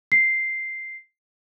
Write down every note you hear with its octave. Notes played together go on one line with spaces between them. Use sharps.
C7